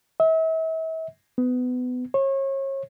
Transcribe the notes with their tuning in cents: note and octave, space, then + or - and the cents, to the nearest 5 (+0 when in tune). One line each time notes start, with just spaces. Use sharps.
E5 -40
B3 +25
C#5 -35